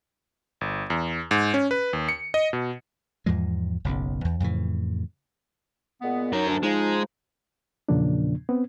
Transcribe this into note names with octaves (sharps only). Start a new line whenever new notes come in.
G1
E2
G#2
C#4
B4
D#2
C#7
D#5
B2
E2 G#2 F3 G#3
F#1 B1 C#3
E2
F2 A2 C#3 E3
A#2 G#3 B3
F#2 F#3 D#4 A#4
D2 D4
F3 G#3 D#4
E2 A#2 C#3 F3 A#3 D4
B3 C4